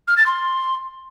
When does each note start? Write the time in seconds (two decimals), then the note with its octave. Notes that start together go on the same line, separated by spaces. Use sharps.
0.07 F6
0.17 A6
0.26 C6